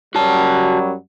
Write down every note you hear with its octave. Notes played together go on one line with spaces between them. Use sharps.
F#2 F#3 G3 F#4 A5